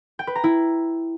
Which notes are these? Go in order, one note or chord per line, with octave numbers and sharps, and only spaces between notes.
G5
B4
A#5
E4